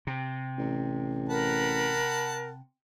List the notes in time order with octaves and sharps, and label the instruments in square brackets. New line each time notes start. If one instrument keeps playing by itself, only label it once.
[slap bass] C3
[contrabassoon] A1
[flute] A#4 [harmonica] F#5 A5 B5